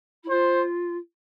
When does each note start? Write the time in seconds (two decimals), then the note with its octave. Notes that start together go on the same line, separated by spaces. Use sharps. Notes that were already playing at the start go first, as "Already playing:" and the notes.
0.23 E4
0.29 F4 C5